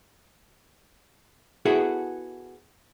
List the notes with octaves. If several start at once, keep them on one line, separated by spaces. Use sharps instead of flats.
B3 E4 F#4 G#4 A4